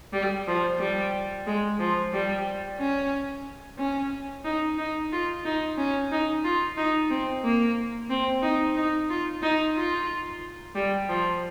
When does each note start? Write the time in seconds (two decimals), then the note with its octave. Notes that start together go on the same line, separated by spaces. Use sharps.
0.13 G3
0.47 F3
0.79 G3
1.46 G#3
1.79 F3
2.12 G3
2.79 C#4
3.78 C#4
4.44 D#4
4.78 D#4
5.12 F4
5.45 D#4
5.77 C#4
6.11 D#4
6.44 F4
6.77 D#4
7.10 C4
7.44 A#3
8.10 C4
8.42 D#4
8.76 D#4
9.09 F4
9.42 D#4
9.76 F4
10.75 G3
11.09 F3